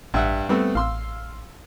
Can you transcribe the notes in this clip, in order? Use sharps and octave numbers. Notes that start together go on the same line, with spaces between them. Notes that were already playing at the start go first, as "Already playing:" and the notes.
A1 G2 E5 F#5
G3 A3 B3 C4
A1 F5 C6 E6